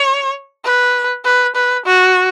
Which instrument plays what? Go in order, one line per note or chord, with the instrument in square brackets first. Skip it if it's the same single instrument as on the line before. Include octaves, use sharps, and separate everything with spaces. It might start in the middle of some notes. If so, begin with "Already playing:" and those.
Already playing: [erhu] C#5
B4
B4
B4
F#4